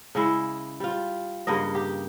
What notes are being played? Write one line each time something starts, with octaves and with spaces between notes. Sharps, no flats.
C#3 G#3 E4
G3 F4
G2 C#3 A#3 D#5
G4